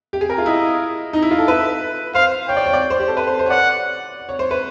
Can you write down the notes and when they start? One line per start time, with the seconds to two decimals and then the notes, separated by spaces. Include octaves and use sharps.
0.13 G4
0.21 G#4
0.30 A#4
0.38 F4
0.46 E4 D#5
1.13 D#4
1.22 E4
1.31 F4
1.39 A4
1.48 B4 E5
2.15 C5 F5
2.48 C#5 G5
2.56 D5
2.66 C#5
2.73 D5
2.90 C5
2.99 G4
3.08 A4
3.17 B4
3.27 C5
3.39 C5
3.46 C#5
3.50 D5 F#5
4.29 C#5
4.39 C5
4.51 B4